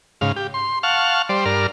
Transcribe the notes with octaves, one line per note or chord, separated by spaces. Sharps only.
G#2 C#3 F5
G4
C6
F5 F#5 A5 C#6 F6
G3 C5 D5
G2 A#4 D5 F6